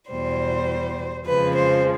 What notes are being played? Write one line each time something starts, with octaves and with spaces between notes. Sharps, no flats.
E2 B2 G3 C5
F2 C#3 F3 G#3 B4
C5